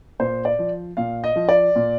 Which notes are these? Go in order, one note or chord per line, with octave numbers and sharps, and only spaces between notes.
A#2 C5
D5
F3
A#2 F5
D#5
F3
D5
A#2